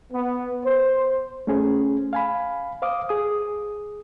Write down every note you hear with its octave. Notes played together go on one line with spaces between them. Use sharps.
B3
C5
A3 C#4 G#4 C5
F5 G#5 B5
C5 F5 D6 D#6
G#4 D#6